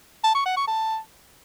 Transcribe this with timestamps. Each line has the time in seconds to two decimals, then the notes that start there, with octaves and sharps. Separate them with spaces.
0.24 A5
0.35 C#6
0.46 F#5
0.57 C#6
0.67 A5